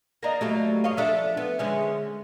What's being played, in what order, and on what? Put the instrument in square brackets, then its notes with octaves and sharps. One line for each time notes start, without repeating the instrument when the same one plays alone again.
[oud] A#3 D4 [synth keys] D#5 A#5 A#6
[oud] F#3 G3 A#3 [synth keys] A3
[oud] G2 C#5 D#5 [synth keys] F5
[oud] F3 D4 A4 [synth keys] E5
[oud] B3
D3 G#3 C#4